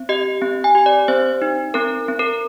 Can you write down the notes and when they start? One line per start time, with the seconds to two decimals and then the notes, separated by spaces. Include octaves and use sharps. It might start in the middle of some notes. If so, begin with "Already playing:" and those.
Already playing: C4
0.09 G4 D#5
0.42 C4
0.64 G#5
0.75 G4
0.86 D5
1.08 C4 C5
1.42 D#4
1.74 C4 A#4
2.08 C4
2.19 A#4